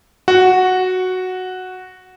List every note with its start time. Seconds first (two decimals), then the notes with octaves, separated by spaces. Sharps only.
0.28 F#4